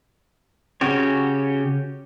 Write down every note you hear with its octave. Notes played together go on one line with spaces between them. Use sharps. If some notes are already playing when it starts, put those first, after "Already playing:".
C#3 C#4 F#4 G4 C#5